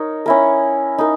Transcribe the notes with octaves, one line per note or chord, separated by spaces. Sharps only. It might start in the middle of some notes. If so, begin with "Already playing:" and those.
Already playing: D#4 A#4 C#5
C#4 E4 A#4
D#4 A#4